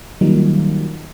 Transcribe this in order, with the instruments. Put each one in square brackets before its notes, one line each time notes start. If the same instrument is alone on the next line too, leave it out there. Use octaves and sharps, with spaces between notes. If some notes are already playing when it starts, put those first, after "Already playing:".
[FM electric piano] D#3 F#3 G3 A#3 D#4 F4